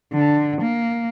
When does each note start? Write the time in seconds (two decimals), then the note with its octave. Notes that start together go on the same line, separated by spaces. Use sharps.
0.14 D3
0.61 A#3